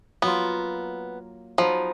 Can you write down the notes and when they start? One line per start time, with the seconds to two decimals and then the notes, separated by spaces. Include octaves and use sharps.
0.22 F#3 A#3 B3 F4
1.58 F3 F#3 B3 D#4